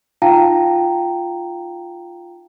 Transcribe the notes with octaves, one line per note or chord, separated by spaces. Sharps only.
D#4 F4 F5 G5 A5 A#5